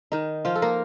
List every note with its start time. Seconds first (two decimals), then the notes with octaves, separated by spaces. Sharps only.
0.12 D#3 D#4
0.45 F3 F4
0.55 A4
0.62 A#3 A#4